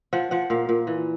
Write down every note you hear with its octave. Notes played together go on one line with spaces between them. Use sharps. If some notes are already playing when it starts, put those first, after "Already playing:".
F3 F#5
F3 F#5
A#2 F5
A#2
E3